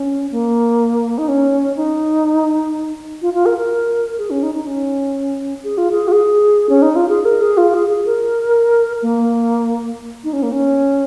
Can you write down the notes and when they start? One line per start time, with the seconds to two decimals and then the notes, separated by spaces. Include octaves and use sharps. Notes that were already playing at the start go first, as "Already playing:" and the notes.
Already playing: C#4
0.31 A#3
1.18 D#4
1.28 C#4
1.76 D#4
3.22 F4
3.34 F4
3.46 A#4
3.58 A#4
4.18 G#4
4.30 C#4
4.43 D#4
4.55 D#4
4.67 C#4
5.64 G#4
5.78 F4
5.92 G#4
6.08 F4
6.12 G#4
6.69 C#4
6.82 D#4
6.96 F4
7.09 G#4
7.25 A#4
7.42 G#4
7.57 F4
7.74 G#4
7.89 G#4
8.06 A#4
9.02 A#3
10.24 D#4
10.33 C#4
10.43 A#3
10.52 C#4